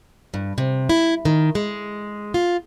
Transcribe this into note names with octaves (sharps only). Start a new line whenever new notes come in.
G2
C3
E4
D#3
G#3
F4